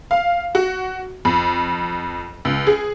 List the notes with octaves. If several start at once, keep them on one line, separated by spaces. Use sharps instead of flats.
F5
F#4
F2
C#2
G#4